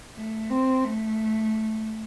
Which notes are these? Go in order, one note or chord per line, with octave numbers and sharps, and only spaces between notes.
A3
C4
A3